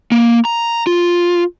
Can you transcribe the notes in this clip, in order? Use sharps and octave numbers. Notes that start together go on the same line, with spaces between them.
A#3
A#5
F4